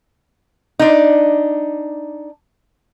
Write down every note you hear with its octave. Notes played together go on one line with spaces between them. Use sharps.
D4 D#4